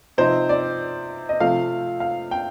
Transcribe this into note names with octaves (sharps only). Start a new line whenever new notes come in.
C3 F3 C4 D#4 C5
D5
D#5
C3 F3 A3 F5
F5
G5